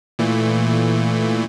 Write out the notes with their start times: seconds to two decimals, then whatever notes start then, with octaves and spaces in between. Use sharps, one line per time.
0.19 A#2 E3 A3